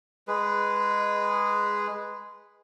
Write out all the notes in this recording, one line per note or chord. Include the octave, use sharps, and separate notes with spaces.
G#3 G#4 B4